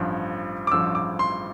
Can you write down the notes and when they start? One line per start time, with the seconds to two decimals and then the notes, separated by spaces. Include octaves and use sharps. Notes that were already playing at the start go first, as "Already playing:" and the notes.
Already playing: A1 G2 F3
0.67 D6
0.72 A1 G2 F3 E6
0.95 D6
1.19 C6